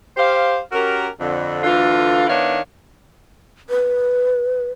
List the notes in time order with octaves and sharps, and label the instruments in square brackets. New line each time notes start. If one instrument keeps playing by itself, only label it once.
[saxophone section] G4 C5 F5
C#4 F#4 G4 A#4
F2 D3
D2 D3 E3 F4
D#3 B3 D4 E4 C#5 F5
[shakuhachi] B4